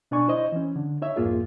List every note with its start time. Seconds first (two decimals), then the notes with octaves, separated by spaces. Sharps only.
0.11 B2 D4 D5 G#5 C#6
0.28 E4 C5 D#5
0.52 E3 C#4
0.76 D3
1.02 D#4 C#5 E5
1.16 C2 F2 G#2 A#3 F4 G#4